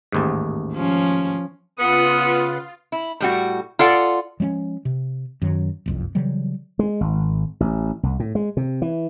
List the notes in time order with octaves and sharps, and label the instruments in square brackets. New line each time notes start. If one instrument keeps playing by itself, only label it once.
[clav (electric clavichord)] A1 D#2 G#2
[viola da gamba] F3 C#4
[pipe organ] C#3 B4 F#5 [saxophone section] B3 [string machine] F4 [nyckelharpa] D#6
[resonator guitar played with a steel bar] E4
A2 G3 F#4
F4 A4 D5 F#5
[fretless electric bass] F3 G#3 C4 C#4
C3
F#2 D#3 F#3
F#1 C2 F2
C#3 E3 F#3 G3
[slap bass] G#3
G#1
A1
C2
A2
G#3
C3
E3